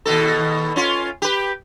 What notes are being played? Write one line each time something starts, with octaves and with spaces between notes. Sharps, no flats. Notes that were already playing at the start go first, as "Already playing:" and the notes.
D#2 B2 A4
C#4 F4
G4 B4